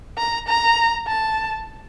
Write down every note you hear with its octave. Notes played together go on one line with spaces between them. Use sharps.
A#5
A#5
A5